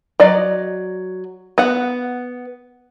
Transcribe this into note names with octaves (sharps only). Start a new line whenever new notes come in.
F#3 D5 D#5
B3 F#5